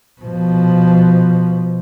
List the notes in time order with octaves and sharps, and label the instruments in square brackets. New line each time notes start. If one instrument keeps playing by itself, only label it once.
[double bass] B2 F3